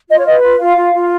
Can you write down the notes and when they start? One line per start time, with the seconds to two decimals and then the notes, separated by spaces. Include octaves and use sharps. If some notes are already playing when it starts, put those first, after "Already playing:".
0.09 F4 D#5
0.18 C#5
0.26 B4 D#5
0.42 F4
0.59 F4 F5
0.76 F4
0.93 F4